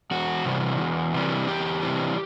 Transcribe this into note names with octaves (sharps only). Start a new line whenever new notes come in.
E2 F#4
C3 E3 G3
E2
C3 E3 G3
E2 G4
C3 E3 G3